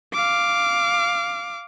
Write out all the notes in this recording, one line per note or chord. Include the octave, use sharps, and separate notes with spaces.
F5 D6